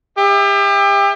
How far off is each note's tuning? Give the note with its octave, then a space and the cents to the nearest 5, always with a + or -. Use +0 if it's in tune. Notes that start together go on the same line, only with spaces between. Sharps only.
G4 +35 E5 -15